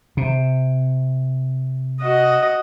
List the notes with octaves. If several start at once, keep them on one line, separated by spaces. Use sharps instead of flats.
C3
F#4 D#5